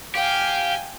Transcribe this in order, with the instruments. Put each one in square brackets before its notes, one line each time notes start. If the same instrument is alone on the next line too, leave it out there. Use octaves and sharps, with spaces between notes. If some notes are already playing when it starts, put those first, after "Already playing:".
[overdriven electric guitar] G4 [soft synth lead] F5 [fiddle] G5 G#5